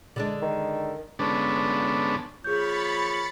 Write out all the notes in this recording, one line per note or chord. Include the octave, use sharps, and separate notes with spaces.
D3 G#3 D4
D#3
D3 G#3 B3 C#4 D4 A4
F3 A#3 G#4 C#5 B5 G6 A6 C#7